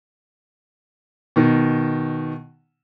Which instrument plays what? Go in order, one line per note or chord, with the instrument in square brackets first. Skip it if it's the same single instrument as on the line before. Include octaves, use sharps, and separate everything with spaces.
[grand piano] B2 D#3